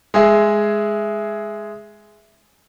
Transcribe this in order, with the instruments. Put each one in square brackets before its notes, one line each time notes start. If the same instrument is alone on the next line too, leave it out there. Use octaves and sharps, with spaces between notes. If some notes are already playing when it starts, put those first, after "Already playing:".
[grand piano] G#3 G#4 E5